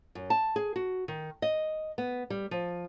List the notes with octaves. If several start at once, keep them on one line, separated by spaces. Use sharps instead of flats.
F#2
A5
G#4
F#4
D#3
D#5
B3
G3
F3